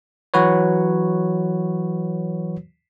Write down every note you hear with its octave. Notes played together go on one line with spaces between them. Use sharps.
E3 F#3 F#4 B4 C#5